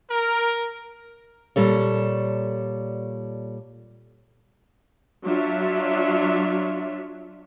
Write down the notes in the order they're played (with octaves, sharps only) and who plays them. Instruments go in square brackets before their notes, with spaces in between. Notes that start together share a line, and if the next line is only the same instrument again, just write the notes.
[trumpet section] A#4
[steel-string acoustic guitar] A#2 G3 A4 C#5
[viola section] F#3 D4 F4 C#5 E5